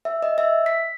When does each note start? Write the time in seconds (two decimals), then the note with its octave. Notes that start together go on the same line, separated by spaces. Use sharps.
0.05 E5
0.23 D#5
0.38 E5
0.66 B6